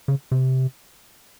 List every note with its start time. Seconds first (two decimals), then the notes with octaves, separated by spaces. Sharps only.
0.08 C#3
0.31 C3